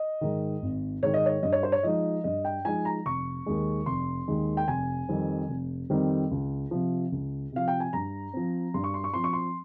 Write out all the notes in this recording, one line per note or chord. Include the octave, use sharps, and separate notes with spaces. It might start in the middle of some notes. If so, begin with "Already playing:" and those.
Already playing: D#5
G#2 D#3
G#1
G#2 D#3 C#5
D#5
C#5
G2 D#5
C#5
C5
C#5
F3 G#3 D#4 D#5
G2 D#5
G5
F3 G#3 D#4 G#5
A#5
F1 C#6
D#2 D#3 G#3
F1 C6
D#2 D#3 G#3
G5
F1 G#5
F2 D#3 G3 C4
F1
F2 D#3 G3 C4
C#2
C3 F3
C#2
C3 F3 F5
G5
G#5
G2 A#5
F3 C4
G2 C6
C#6
C6
C#6
F3 C4 C6
C#6
C6